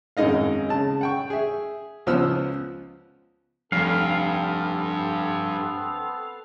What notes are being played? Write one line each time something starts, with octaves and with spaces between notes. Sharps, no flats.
G#1 F#2 G#3 D#4 D#5 F5
C#3 A5
F#5 G5 C#6
G#4 E5
C#2 F3 B3 C5 E6 F6
F1 G2 B3 C4 A4 F5